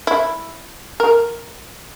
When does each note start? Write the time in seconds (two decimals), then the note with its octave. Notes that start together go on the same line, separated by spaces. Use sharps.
0.07 E4
1.00 A#4